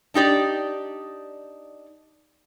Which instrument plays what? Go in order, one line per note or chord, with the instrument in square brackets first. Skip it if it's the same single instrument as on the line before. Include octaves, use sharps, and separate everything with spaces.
[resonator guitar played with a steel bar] D4 D#4 G4 D5